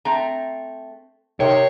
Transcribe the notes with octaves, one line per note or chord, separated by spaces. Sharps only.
A3 C4 A#5
C3 D#3 C5 C#5 G5